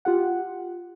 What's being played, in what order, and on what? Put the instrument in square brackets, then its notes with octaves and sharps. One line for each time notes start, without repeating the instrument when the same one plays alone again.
[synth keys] F4 G4 F#5